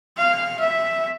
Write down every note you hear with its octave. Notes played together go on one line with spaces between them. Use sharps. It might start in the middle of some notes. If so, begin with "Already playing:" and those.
F5
E5